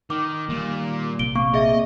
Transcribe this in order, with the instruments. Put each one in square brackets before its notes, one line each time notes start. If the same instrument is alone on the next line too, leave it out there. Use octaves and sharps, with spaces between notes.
[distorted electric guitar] D#3 [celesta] D6
[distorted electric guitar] A#2 [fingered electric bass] D#3 G3
[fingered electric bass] A#1 C3 [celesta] D7 G7
[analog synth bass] A#3 [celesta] C#6
[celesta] G#4 E5 [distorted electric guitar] D#5